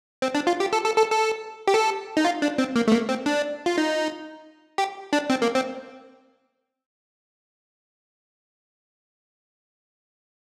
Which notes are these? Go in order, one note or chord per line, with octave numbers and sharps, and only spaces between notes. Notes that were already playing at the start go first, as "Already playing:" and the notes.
C4
D4
F4
G4
A4
A4
A4
A4
G4
A4
D#4
F4
D4
C4
A#3
A3
A#3
C4
D4
F4
D#4
G4
D4
C4
A#3
C4